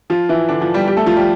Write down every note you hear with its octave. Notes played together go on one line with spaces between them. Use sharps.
F3 F4
E3 E4
D3 D4
F3 F4
G3 G4
G3 G4
A3 A4
F3 F4
G3 G4